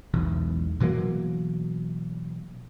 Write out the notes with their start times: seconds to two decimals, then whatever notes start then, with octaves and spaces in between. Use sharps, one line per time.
0.14 E1 B1 E3
0.80 B2 E3 F#3 A#3